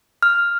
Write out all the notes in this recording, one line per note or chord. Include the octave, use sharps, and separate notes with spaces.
F6